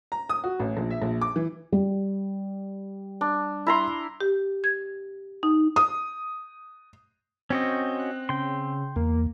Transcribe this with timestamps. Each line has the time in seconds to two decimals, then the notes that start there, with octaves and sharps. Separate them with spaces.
0.12 A#5
0.29 D#6
0.44 F#4
0.60 A1
0.77 A#1
0.90 E5
1.02 A#1
1.21 D6
1.36 E3
1.72 G3
3.21 D4
3.67 E4 A#5 C6
4.21 G4
4.64 G#6
5.43 D#4
5.76 D#6
7.50 C4 C#4 F#4 D#5 G6
7.99 F#6
8.29 C#3 G5 C6
8.96 E2 A#3